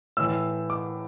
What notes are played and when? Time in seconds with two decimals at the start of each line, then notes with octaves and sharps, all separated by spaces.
0.17 A2 E3 E6
0.70 D6